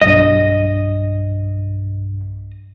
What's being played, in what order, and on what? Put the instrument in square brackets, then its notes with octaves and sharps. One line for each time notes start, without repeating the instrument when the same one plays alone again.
[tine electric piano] B1 G2 [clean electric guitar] D#5